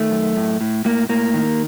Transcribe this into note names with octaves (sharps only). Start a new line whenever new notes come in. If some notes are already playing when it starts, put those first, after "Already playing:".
Already playing: D#3 A3
F#2
A2
A2
A2 A#3
A2 A#3
D#3